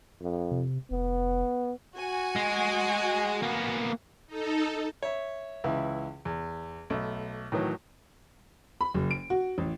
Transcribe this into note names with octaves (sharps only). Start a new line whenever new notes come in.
F2
C3
F1 B3
F#4 G#5
G#3
A#3 B3
D#4 A4
C#5 E5
C#2 E3 E4
E2
B1 A3
A2 D#3 E3 F#3
B5
F#1
D7
F#4
A1